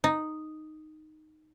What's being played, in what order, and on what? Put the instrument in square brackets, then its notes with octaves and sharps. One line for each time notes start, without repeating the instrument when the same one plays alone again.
[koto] D#4